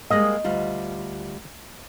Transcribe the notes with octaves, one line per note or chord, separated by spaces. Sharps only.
G3 G#3 A#3 D#5
D2 G3 F4